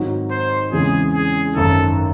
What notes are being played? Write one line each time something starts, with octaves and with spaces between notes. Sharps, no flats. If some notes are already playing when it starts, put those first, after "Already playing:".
Already playing: G#2 D#3 F#3 C4 F#4
C5
E2 C#3 E3 G#3 C4 G#4
G#4
G#1 F#2 D#3 A4